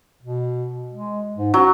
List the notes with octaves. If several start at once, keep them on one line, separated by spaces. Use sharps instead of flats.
B2
G#3
G#2
F#3 C#4